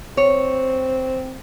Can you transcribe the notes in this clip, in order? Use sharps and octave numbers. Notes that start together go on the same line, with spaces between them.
C4 C#5